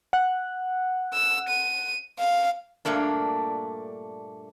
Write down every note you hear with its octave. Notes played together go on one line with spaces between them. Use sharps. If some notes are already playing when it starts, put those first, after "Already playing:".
F#5 F#6
E6
D#7
F5
G2 A#2 A3 A#3 D4